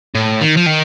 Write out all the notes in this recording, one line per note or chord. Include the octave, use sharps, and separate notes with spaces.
A2
D#3
F3
D#3